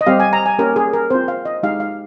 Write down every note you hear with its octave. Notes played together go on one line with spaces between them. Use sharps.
D#5
G3 C4 G4 F5
G#5
A#5
G#5
A#3 C#4 G4 A#4
G#4
A#4
C4 F4 C5
F5
D#5
G#3 D#4 G4 F5
F5